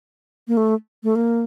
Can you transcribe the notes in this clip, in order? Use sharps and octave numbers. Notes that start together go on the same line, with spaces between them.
A#3
A3
A3
A#3